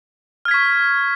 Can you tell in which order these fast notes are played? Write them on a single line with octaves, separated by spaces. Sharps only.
F6 G#6 B6 C#6